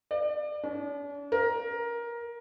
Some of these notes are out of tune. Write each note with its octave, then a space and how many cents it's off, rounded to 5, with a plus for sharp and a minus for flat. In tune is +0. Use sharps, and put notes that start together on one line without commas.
D5 +30
D4 -40
A#4 +15